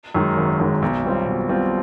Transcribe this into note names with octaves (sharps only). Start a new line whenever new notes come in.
F#2 D#3 G#3
G#1
F#2 D#3 G#3
B1
B2 G3 C4 F4
B1
B2 G3 C4 F4